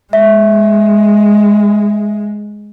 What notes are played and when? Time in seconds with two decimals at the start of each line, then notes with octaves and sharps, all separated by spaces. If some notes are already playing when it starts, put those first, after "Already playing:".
0.13 G#3 E5